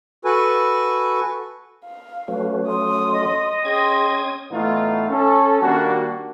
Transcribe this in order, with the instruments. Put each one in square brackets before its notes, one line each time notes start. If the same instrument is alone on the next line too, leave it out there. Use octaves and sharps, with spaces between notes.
[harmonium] F#4 A4 B4 G#5
[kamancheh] F5
[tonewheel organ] F#3 A3 C#4 [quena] B4
[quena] C6 [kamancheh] D#6
[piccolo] D#5
[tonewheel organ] C#4 D#6 G#6 [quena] G#4 [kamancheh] G5 C6
[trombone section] A2 E3 A3 B3 D#4 F4
C#4 A4
D#3 G3 A#3 D4 F#4